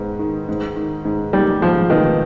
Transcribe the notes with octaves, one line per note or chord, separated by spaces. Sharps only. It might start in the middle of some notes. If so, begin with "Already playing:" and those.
Already playing: G#2 D#3 B3
D#3
G#2
D#3
G#2
D#3 G3
G#2 F3
D#3 B3